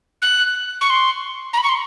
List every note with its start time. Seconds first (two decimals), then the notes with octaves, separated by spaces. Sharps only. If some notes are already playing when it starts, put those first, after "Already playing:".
0.22 F#6
0.81 C#6
0.90 C6
1.53 A#5
1.58 B5
1.63 C#6
1.69 C6